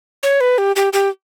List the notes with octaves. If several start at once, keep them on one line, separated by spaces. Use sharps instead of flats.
C#5
B4
G4
G4
G4